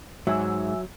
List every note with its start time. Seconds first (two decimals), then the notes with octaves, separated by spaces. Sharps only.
0.27 G#2 F#3 E5 G#5 E6